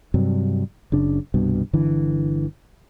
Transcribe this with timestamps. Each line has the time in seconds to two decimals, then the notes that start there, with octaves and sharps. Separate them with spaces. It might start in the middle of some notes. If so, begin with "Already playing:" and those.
0.14 G2 C3 F#3
0.92 F#1 C#3 D4
1.34 C2 G2 B2
1.73 G1 D3 E3